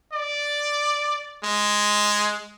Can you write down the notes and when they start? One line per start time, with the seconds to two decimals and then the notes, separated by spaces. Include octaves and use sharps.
0.13 D5
1.43 G#3